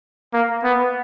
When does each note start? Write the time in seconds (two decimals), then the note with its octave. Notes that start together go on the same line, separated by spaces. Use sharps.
0.33 A#3
0.64 B3